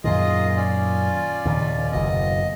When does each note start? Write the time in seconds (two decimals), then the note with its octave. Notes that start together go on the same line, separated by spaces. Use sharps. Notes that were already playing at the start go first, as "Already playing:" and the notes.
0.04 F#2 A#2 D#3 F4 G#4 D#5
0.56 C#4 F4 D5
1.45 D#2 A#2 C#3
1.92 F#1 B2 D#5